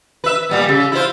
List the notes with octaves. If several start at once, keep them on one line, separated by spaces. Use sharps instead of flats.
B4 E5
A#2 G3 B3
A#2 C#3
E4 F4 C5